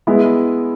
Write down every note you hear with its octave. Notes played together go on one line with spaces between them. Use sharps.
G#3 B3 E4